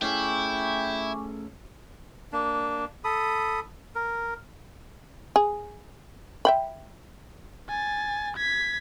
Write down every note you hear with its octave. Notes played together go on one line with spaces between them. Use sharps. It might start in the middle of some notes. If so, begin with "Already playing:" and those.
A3 C#4 E4 G#4 G5 G#5 C#6 D6
A#3 D4
A4 B5 D#6
A#4
G#4
E5 G5 B5
G#5 A6
G#6 B6